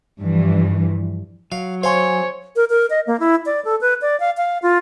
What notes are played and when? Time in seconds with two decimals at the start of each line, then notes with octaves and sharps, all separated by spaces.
0.21 G2 E3 F3
1.52 F#3 F5
1.83 C5 C#5 F5 G#5 C6
2.56 A#4
2.70 A#4
2.90 D#5
3.07 A#3
3.20 E4
3.46 D5
3.65 A4
3.81 B4
4.01 D5
4.20 F5
4.37 F5
4.62 F4